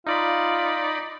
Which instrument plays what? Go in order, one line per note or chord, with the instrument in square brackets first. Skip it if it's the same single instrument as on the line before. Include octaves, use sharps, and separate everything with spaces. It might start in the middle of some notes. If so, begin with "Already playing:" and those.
[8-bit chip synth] D#4 D5 B5 [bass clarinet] F4